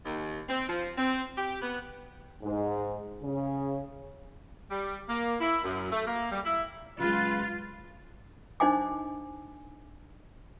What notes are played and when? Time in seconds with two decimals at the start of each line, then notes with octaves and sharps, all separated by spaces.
0.05 D#2
0.49 C4
0.68 F3
0.97 C4
1.38 G4
1.62 B3
2.43 G#2
3.23 C#3
4.70 G3
5.09 A#3
5.41 E4
5.64 F#2
5.92 A3
6.07 A#3
6.32 G3
6.45 E4
7.00 C#3 F#3 G#3 F4 B4
8.60 D4 D#4 C5 D#5 G#5 D6